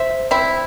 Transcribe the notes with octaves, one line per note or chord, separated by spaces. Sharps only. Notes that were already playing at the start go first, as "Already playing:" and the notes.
Already playing: C5 E5
C4 E4